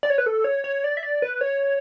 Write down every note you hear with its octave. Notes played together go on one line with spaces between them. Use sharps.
D5
C#5
B4
A4
C#5
C#5
D5
E5
D5
B4
C#5